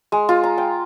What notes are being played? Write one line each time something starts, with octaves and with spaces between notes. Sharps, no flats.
G#3
F4
A#5
G5